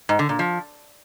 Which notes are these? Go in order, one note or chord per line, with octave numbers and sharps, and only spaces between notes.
G#2
D3
A#2
F3